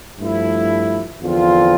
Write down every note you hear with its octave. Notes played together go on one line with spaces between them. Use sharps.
G2 F3 A3 E4
E2 D3 F3 C4 F4